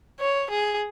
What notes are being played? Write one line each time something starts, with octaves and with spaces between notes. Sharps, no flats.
C#5
G#4